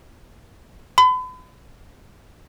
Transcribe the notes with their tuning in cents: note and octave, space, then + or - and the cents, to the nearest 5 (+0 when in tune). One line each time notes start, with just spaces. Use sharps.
B5 +40